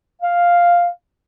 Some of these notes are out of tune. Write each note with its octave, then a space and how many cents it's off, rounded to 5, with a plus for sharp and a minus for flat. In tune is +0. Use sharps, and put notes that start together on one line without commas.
F5 +0